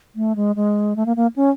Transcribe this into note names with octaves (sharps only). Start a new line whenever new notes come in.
A3
G#3
G#3
A3
A#3
A#3
C#4